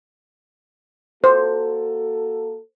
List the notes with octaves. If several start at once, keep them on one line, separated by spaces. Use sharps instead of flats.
A#3 F#4 A4 C5